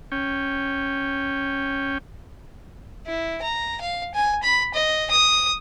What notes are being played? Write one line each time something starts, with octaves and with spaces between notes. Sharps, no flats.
C#4 G5
E4
A#5
F5
G#5
B5
D#5
D#6